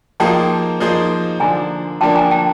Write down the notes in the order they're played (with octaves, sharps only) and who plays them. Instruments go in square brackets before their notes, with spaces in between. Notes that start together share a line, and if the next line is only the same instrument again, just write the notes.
[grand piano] F3 A#3 D#4 G#4 C5 [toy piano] G5 A5
[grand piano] F3 A#3 D#4 G#4 C5
[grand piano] D3 F3 A#3 D4 [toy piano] G#5 A#5
[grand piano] D3 F3 A#3 D4 [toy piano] G5 A5
[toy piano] G#5 A#5
G5 A5